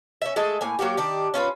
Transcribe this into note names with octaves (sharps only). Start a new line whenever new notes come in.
C#4 E5
G#3 A3 G#4 A4
A2 A#3 G#5
F#3 A#3 F#4 G4
D#3 D4 G4
C#4 F4 A#4 B4